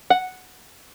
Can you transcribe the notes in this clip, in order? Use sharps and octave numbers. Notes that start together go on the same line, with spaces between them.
F#5